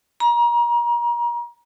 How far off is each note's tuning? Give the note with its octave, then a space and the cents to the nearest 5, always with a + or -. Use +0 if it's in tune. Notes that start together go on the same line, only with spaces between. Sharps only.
A#5 +30